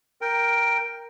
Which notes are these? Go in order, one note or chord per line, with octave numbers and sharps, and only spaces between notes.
A#4 G5